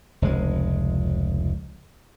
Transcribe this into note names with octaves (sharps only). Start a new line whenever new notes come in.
F1 C#2 G#3